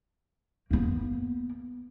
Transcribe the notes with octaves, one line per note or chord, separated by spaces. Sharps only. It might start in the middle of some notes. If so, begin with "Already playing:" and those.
A#3 B3